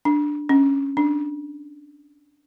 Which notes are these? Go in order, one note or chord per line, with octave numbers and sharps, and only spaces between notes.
D4
C#4
D4